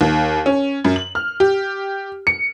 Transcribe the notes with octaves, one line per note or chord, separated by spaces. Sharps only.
D#2
C#4
F#2
F#7
F6
G4
C#7